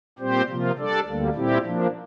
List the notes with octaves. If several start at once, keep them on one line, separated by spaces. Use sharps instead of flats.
A#2 G3 C4 G4 C5
C3 F3 A#3 F4
G3 D4 A4 D5
D2 D3 G3 A#3
A#2 G3 C4 E4 G4
F3 A#3 D4